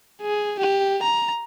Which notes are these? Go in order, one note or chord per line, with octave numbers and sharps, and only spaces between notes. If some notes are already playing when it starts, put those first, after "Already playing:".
G#4
G4
A#5